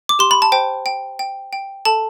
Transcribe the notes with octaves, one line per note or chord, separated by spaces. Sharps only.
D6
G4 C6
B5
A5
C5 G5
G5
G5
G5
A4 A5